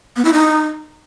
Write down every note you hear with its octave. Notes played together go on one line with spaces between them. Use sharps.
B3
E4
D#4